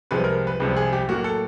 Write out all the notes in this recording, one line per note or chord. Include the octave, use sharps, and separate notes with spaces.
C2 C3 F3 G#3 B4
A#4
B4
C2 C3 F3 G#3
G#4
G4
A2 F#3 A#3 F#4
A4